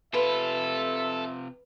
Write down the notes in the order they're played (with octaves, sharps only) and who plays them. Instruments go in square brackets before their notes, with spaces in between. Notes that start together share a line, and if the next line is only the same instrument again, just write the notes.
[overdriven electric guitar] C3 F4 [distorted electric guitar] A4 [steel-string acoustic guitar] B4 [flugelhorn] E5